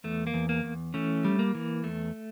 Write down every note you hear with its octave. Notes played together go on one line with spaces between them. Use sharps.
E2 A3
A#3
E2
A#3
E2
E3 A3 C#4
G3
A#3
E3
E2 A3